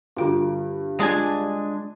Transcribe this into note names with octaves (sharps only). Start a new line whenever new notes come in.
G2 D3 F4 F#4
G#3 D4 F4 G#5